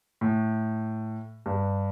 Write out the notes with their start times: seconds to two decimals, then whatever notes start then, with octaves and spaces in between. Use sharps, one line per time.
0.21 A2
1.46 G2